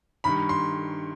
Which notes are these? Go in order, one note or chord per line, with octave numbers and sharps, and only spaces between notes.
G2 D#3 B5
C6